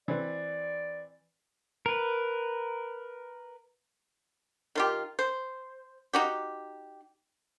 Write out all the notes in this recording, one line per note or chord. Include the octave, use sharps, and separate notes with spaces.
E3 C4 B4 D5
A#4 B4
D#3 F4 G4
C5
D#4 F#4 G4